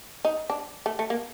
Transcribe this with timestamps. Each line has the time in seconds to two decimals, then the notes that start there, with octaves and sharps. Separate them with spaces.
0.25 D#4
0.50 D4
0.86 A3
0.99 A3
1.10 A#3